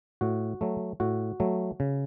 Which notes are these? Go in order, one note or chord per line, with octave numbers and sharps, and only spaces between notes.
A2 F#4
F#3 A3
A2 F#4
F#3 A3
C#3